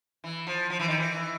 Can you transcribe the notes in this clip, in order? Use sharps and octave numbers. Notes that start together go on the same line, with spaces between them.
E3
F3
F3
E3
D#3
E3